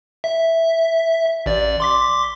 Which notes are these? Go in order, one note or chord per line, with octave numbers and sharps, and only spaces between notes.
E5
A1 D5
C6 D6 B6